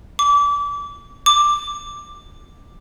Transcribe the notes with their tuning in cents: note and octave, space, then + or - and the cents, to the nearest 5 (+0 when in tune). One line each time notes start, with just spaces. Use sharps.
D6 -30
D6 +5